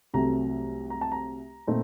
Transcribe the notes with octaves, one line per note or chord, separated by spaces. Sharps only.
C2 C3 F#3 A3 A#5
A#5
A5
A#5
A#2 A3 C4 D#4